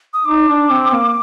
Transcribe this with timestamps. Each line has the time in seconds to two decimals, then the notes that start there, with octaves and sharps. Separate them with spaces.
0.14 D#6
0.25 D#4 D6
0.49 D4
0.70 C4
0.93 A#3